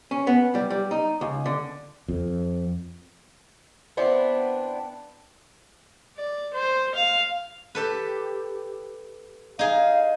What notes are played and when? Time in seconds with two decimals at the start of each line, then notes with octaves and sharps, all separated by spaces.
0.11 C#4
0.27 B3
0.55 G3
0.70 G3
0.91 D#4
1.21 C#2
1.46 D3
2.08 F2
3.97 B3 C4 D4 E4
6.17 D5
6.54 C5
6.95 F5
7.75 G4 A4 B4
9.59 D#4 G#4 F5